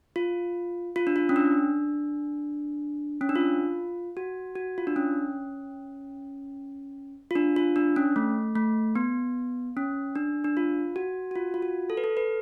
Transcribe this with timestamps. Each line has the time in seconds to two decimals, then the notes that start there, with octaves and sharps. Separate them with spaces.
0.16 F4
0.96 F4
1.07 D4
1.16 F4
1.29 C#4
1.36 D4
3.21 C#4
3.29 D4
3.35 F4
4.17 F#4
4.55 F#4
4.78 F4
4.87 D4
4.96 C#4
7.31 F4
7.35 D4
7.56 F4
7.76 D4
7.96 C#4
8.16 A3
8.55 A3
8.95 B3
9.77 C#4
10.16 D4
10.44 D4
10.57 F4
10.96 F#4
11.31 F#4
11.36 F4
11.54 F4
11.62 F#4
11.90 A4
11.97 B4
12.04 A4
12.17 B4